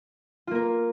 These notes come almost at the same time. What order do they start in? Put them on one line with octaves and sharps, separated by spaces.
F4 A#3 A#4